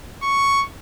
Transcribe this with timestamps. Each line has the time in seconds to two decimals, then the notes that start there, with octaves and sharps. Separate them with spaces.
0.23 C#6